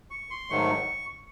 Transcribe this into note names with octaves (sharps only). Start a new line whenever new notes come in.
C#6
C6
G#2 D#3 F#3 A3 C#6